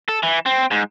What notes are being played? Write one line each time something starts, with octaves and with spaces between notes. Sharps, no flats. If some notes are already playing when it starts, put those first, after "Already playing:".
A4
E3
C4
G#2